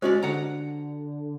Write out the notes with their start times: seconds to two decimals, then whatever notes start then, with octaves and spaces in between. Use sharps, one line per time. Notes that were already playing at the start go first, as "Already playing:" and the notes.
0.02 G#3 C#4 F#4 G4 C5 D5
0.23 D3 F#5 A#5